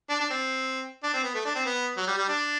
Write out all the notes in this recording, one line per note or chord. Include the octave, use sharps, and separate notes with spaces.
D4
D4
C4
D4
C4
B3
A3
D4
C4
B3
F#3
G3
G3
D4